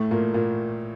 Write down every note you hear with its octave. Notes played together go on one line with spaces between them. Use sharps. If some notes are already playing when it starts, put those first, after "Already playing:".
Already playing: A2 A3
A#2 A#3
A#2 A#3